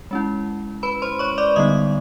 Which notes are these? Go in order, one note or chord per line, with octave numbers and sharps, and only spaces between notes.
G#3 C#4 E4
B4 B5
C5 C6
C#5 C#6
D5 D6
D3 G3 B3 D#4 D#5 D#6